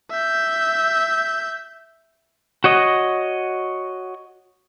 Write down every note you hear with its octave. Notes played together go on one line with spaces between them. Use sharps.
E5 G6
F#4 C#5 D#5